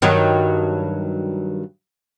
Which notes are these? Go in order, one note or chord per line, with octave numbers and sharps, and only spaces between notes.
G2 D#3 F#3